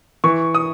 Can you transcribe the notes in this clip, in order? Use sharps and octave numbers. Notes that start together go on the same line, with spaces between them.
E3 C#6
D#6